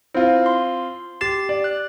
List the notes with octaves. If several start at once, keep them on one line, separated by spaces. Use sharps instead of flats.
C4 E4 F4
C6
G4 A6 C7 E7
D5
F#6